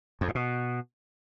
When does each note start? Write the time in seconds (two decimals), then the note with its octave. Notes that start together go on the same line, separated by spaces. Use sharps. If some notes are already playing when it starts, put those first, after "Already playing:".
0.21 F2
0.28 G#2
0.35 B2